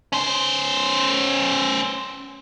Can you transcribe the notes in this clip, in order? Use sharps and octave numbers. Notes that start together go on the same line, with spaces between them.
C#4 C5